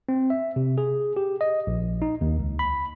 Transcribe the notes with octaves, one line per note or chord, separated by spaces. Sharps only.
C4
E5
C3
G#4
G4
D#5
A#1
D#4
D#2
C#2
B5